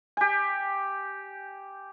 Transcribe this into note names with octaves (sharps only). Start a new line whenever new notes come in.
G4 G#5